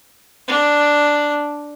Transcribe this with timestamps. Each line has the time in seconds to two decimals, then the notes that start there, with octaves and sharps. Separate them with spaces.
0.47 D4